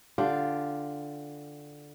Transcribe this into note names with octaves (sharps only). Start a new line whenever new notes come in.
D3 F4 G4